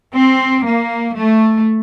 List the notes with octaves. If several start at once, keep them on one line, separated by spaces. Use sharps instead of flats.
C4
A#3
A3